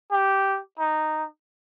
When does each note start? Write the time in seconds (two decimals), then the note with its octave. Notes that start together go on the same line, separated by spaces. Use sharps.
0.12 G4
0.79 D#4